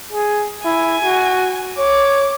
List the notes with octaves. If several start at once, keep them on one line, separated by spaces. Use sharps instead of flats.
G#4
E4 G#5
F#4
C#5 D6